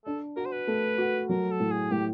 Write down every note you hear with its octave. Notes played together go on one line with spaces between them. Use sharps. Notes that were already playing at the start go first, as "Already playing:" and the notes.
D4 A4
F#4 A#4
C5
B4
A3
F#4
F#3 A#4
A4
A2
G#4
A2 G4